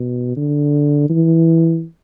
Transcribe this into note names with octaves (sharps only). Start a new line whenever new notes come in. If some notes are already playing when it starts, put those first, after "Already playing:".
Already playing: B2
D3
E3